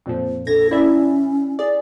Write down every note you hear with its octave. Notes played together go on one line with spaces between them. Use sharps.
F2 A#2 F3
A#1 A4 G#6 A#6
C#4 E4 D5 E5
G#4 D5